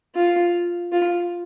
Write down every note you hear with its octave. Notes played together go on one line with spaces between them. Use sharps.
F4
F4